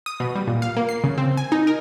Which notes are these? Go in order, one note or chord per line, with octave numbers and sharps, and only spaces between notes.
D#6
B2
G3
A#2
F5
A#3
C7
C#3
C4
G#5
D#4
A#4